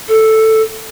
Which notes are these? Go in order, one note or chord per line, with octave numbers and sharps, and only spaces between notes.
A4